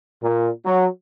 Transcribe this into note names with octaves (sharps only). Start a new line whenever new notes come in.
A#2
F#3